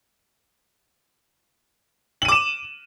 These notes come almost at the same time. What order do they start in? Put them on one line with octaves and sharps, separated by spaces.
F#7 D#7 D6 E7